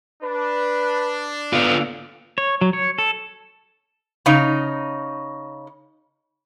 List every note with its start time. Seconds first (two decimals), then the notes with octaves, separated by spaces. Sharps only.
0.23 D4 B4
1.53 D3 B3 F4 F5
2.38 C#5
2.61 F#3
2.73 C#5
2.98 A4
4.26 C#3 D#4